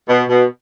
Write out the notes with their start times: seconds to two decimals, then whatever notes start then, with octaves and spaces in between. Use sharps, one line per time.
0.07 B2
0.28 B2